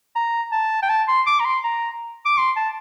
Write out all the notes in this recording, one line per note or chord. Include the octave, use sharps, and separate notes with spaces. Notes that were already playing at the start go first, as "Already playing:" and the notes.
A#5
A5
G5
A5
C6
D6
A#5
C6
A#5
D6
C6
A5